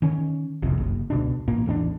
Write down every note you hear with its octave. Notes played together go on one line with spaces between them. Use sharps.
D#3 C#4
F#1 C2 F2 C3
F#1
C#2 B2 D4
A1 A#2 A#3
A1 E2 C4 D4